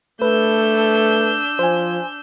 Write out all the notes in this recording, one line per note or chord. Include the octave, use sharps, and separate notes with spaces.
A3 D4 B4 E6 G6
F3 C5 G#5